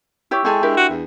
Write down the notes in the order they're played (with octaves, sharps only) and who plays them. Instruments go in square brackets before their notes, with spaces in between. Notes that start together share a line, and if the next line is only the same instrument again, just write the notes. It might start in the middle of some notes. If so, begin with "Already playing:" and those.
[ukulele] E4 G4 C#5 [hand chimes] C#6 E6
[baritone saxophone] G#3 [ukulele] E4 A4 G#5 [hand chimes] G5 C6 G6
[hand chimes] D4 [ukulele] E4 G4 A#4
[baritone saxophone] F#4
E2